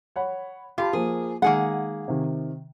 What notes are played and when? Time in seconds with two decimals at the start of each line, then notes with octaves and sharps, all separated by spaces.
0.16 C#5 F#5 B5
0.78 F4 G4 A5 B5
0.93 F3 A#3 G#4
1.42 D#3 G#3 A#3 G#4 F#5
2.08 C3 D#3